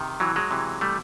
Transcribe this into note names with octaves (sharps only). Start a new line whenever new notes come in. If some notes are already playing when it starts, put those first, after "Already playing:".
Already playing: C3 D#3
E3 F#3
F#3 G#3
C3 E3
G3 A3